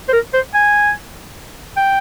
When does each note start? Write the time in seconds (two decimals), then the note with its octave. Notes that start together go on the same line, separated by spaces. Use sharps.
0.09 C5
0.13 A#4
0.34 C5
0.54 G#5
1.77 G5